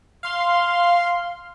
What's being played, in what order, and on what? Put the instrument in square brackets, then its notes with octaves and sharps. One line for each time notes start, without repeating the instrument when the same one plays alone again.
[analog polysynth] F5 C6